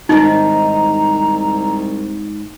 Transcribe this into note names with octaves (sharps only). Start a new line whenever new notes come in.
C2 G#2 D#3 C4 D#4 A#5